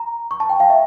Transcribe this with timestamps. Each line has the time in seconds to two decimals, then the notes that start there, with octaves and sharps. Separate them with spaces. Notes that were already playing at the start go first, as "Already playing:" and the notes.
Already playing: A#5
0.31 C#6
0.40 A5
0.49 G5
0.60 F5
0.70 E5